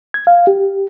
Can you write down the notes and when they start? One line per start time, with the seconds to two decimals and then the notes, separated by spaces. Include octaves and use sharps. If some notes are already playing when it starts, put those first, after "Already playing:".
0.14 G#6
0.27 F5
0.47 G4